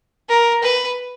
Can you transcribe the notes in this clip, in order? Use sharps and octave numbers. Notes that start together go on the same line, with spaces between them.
A#4
B4